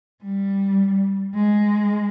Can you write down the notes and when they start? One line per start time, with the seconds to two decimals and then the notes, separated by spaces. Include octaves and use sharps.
0.23 G3
1.35 G#3